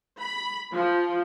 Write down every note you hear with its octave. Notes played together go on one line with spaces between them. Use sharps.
B5
F3